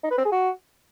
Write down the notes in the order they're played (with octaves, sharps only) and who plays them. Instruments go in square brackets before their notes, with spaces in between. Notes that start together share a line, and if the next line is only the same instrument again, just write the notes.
[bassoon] D#4
B4
C4
G#4
F#4